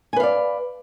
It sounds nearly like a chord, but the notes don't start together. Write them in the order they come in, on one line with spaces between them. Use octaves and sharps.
G#5 B4 F5 D5